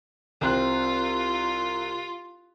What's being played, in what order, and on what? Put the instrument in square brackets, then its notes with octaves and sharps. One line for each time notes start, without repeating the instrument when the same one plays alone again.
[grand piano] C2 C4 F#6 [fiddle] F4